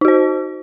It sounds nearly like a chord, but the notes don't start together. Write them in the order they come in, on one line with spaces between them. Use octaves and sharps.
D#4 F#4 C5